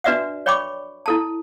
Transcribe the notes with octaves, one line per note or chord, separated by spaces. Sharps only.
D4 F#4 B4 D5 E5 F#5
C#5 D5 G5 B5 C#6 D6
E4 A4 A5